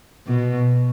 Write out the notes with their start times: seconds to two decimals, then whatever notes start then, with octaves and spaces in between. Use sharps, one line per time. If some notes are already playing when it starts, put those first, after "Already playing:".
0.27 B2